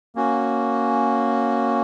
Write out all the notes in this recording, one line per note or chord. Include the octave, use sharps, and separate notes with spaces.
A#3 C#4 F#4